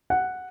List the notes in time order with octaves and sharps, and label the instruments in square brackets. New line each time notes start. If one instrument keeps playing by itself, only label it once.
[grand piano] F#5